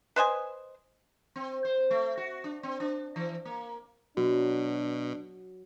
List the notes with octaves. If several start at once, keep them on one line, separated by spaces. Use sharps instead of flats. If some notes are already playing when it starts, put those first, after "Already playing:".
B4 C5 D#5 G#5
C4
C5
A3
F#4
D4
C4
D4
E3
A#3
B2 F#3 D4 F#4